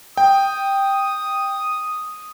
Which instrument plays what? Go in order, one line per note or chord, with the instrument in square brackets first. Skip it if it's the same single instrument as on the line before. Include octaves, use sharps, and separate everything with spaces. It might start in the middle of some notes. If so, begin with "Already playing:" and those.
[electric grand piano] G5 [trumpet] D#6